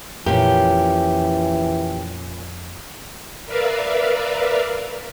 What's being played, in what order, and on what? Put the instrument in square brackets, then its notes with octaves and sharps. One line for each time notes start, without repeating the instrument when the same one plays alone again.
[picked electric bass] F2 [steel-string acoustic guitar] A#2 C#4 [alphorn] E3 [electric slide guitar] G4
[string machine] A#4 B4 D5 E5 F5